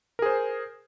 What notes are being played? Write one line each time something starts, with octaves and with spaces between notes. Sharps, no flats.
G#4 A#4 C5